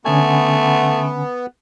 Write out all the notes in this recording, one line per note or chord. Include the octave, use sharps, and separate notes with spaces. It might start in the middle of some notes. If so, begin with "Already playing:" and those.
D3 A3 B3 C#4 G#5